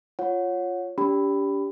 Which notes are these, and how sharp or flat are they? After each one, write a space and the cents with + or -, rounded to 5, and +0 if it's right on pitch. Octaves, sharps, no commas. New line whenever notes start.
F4 +0 C#5 +0 F#5 -20
D4 -40 G4 +0 B5 +10